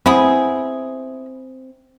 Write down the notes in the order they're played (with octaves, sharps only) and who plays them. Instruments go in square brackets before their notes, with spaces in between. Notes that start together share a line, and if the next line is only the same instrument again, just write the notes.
[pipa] B3 E4 G#4 [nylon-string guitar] C4